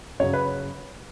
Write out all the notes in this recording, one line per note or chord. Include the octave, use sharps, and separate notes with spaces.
F#2 C#3 F#3 C#5
B4